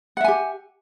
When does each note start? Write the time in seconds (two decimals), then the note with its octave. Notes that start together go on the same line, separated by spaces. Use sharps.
0.17 F#5
0.21 E5
0.24 G#5
0.28 G4